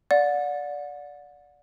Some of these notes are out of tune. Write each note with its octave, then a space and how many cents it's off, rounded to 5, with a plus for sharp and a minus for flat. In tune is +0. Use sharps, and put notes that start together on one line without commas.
D5 -10 F#5 -35